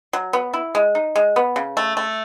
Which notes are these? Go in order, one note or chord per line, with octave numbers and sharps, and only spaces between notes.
F#3
B3
E4
G#3
D#4
G#3
B3
C#3
A3
A3